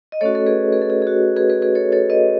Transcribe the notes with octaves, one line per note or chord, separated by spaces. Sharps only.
D#5
A3 C#4 F#4 A4 C#5
A4
G#4 B4
G#4 B4
A4
G#4
G#4
F#4
G#4 B4
G#4 B4
G#4 B4
A4 C#5
A4 C#5
B4 D#5